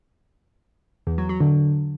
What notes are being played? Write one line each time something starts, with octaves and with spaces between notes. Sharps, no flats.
E2
F#3
F#3
D3